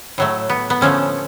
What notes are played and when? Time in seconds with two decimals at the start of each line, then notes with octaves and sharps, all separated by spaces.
0.18 A2 F#3 A3
0.49 B3
0.70 B3
0.81 D3 F3 A3 C#4